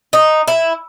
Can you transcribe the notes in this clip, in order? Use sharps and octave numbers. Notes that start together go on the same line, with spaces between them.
D#4
E4